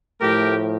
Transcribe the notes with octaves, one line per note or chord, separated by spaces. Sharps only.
A2 F3 A3 G4 A#4